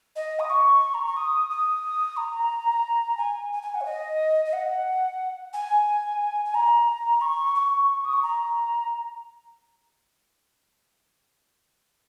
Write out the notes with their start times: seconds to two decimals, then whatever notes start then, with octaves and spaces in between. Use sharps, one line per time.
0.15 D#5
0.39 D#6
0.49 C#6
0.94 A#5
1.05 C#6
1.16 D#6
1.50 D#6
2.16 A#5
3.17 G#5
3.52 G#5
3.62 G#5
3.74 F#5
3.81 C#5
3.85 D#5
4.45 D#5
4.53 F#5
5.53 G#5
6.45 G#5
6.54 A#5
7.21 C#6
7.55 C#6
8.04 D#6
8.13 C#6
8.22 A#5